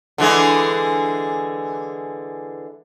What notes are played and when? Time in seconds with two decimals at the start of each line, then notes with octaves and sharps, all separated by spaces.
0.18 D3 E3 G#3